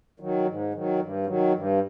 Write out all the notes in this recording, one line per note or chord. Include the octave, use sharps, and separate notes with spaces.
D#3 F#3
G#2
D#3 F#3
G2
D#3 F#3
G2